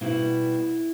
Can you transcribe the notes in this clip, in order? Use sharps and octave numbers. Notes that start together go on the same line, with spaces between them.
B2 G3 B3 E4